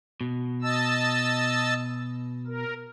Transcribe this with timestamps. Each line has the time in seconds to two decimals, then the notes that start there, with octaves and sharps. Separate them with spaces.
0.21 B2
0.62 D#5 A5 E6
2.47 A#4